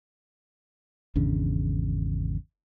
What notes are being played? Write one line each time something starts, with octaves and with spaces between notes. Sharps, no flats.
G#1 E2 C#3 D4